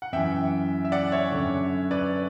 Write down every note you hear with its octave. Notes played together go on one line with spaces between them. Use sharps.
F#5
F#2 E3 E5 G5
E5
D5 F#5
C#5 E5
F#2 D3
B4 D5